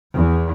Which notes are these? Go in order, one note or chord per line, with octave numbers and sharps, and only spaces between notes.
E2